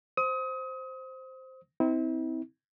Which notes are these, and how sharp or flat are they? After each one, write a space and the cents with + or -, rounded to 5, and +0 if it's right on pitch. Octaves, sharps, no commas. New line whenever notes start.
C5 +0 D#6 +30
C4 -20 E4 -40